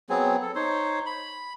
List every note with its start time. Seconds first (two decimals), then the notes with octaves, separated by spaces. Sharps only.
0.10 F#3 B3 C4 G#4
0.42 A4
0.55 D#4 C5 C#5 C6
1.06 B5